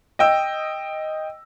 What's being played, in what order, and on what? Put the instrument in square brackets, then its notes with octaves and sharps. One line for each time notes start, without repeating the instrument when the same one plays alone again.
[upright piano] D#5 G5 E6